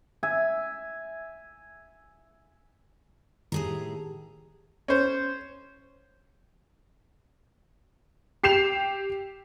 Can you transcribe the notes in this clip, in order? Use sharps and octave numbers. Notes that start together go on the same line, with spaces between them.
E5 G#5
A2 D#3 G4 G#4 A#5
C#4 C5
G4 C7 E7 F7